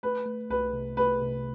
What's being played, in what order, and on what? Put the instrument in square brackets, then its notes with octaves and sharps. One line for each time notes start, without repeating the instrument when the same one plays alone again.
[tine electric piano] A3 [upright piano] B4
[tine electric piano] A3
[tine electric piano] C2 [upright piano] B4
[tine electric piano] C3
[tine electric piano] A3 [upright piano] B4
[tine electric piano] C3